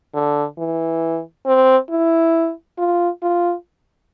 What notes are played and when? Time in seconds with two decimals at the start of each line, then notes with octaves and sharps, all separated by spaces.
0.14 D3
0.59 E3
1.46 C4
1.90 E4
2.78 F4
3.22 F4